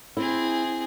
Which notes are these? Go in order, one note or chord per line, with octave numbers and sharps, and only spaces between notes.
C4 E4 G#4